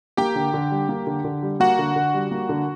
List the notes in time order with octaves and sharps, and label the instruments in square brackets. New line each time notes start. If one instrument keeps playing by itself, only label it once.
[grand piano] A#3 [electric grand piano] G4 G5
[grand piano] D3
D3
G3
A#3
D3
D3
G3
[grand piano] A#3 [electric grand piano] F#4 F#5
[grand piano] D3
D3
G3
A#3
D3